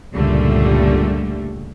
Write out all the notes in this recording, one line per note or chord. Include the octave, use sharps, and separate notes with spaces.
C#2 G2 A#2 D3 G3 A3